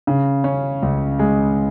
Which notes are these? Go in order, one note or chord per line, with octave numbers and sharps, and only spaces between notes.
C#3
C#4
C#2
G#3